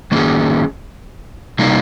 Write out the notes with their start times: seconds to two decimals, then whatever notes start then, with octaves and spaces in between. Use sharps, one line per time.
0.12 D#3 A#3 C#4 G#4
1.59 C3 G3 A#3 D#4